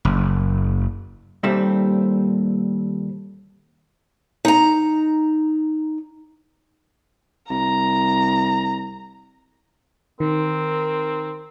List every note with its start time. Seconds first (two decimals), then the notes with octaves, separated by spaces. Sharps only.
0.05 F#1
1.43 D#2 A#2 D#3 G3 A3 C4
4.45 D#4 A#5
7.50 C2 A#5
10.20 D#3 C4 A#4